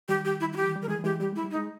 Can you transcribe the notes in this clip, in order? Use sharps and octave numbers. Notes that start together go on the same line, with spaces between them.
D#3 G3 G4
G4
E4
E4
G4
E3
G3
A#4
E3 G#3 G#4
G3
E3 G#3 G4
G3 G4
G#3 E4
G3
D#4
G#3